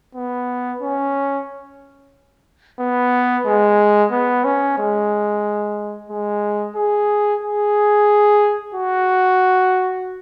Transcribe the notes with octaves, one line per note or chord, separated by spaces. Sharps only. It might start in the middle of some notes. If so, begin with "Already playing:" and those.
B3
C#4
B3
G#3
B3
C#4
G#3
G#3
G#4
G#4
F#4